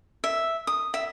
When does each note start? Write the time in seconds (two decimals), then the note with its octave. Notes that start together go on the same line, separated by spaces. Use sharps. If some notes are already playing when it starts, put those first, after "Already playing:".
0.24 E5
0.67 D#6
0.94 E5